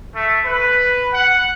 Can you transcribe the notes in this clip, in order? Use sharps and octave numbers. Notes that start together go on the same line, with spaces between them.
A3
B4
F#5